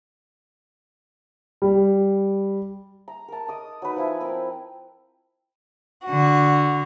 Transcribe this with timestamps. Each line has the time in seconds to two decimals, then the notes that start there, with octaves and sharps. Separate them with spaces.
1.62 G3
3.08 A#5
3.28 A#4 A5
3.48 D#5 D6 D#6
3.82 F#3 D#4 B4
3.96 F3 E4 G#5
4.21 C4 A#4 G5
6.05 D3 F#4